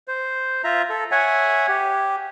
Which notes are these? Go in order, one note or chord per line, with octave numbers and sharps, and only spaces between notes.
C5
F4 E5 A#5
A4
C#5 E5 F#5 G#5
G4